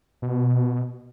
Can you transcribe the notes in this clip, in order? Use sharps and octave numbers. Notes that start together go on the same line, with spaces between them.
B2